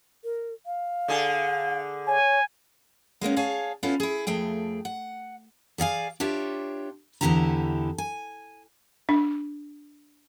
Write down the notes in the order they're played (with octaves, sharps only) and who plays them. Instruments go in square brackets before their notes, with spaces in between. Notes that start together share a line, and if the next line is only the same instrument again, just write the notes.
[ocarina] A#4
F5
[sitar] D3 G#4
[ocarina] C#5 [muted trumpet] G#5
[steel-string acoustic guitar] G#3 A#3 B3 C#4
G#4 C#5 F5 G#5 A5
B3 C#4 E4 F4 A4
E4 G#4
F2 A3 G#4 G5
F#5
G#4 D5 F5 G#5
D4 F4 G4 C#5 E5
E2 A#2 D3 E4 G4 A#5
G#5
[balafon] D4